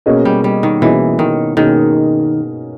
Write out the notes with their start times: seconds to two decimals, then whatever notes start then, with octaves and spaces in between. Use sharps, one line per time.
0.06 B2 A#3 C#4 G#4 D#5
0.25 G3
0.44 G3
0.63 D#3
0.81 B2 E3 A#3 C#4 G#4 D#5
1.19 D#3
1.57 B2 D#3 A#3 C#4 G#4 D#5